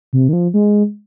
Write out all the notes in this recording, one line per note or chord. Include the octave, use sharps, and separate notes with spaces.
C3
D#3
F3
G#3